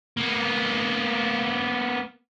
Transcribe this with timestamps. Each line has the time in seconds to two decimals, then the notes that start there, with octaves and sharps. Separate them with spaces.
0.17 A#3 B3